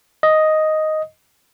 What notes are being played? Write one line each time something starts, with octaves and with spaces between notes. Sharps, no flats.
D#5